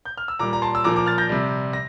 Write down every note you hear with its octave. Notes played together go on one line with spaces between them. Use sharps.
G6
F6
E6
A#2 G3 A#5 D6
A#5
A5 C6
E6
A#2 F3 A#5 D6
A#5 D6
F6 A6
G6 A#6
C3 G3
A#6